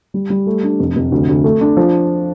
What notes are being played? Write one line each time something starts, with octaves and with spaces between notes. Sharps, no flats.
G3
G3
A3
D4
F1
F1
D2
D2
A3
D4
F3